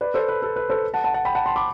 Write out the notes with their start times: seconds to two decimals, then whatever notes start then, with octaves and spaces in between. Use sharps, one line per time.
0.01 B4 D5
0.14 A4 C5
0.28 B4
0.42 A4
0.56 B4
0.70 A4 C5
0.94 F#5 A5
1.04 F#5 A5
1.14 F#5 A5
1.25 G5 B5
1.35 F#5 A5
1.46 A5 C6
1.56 B5 D6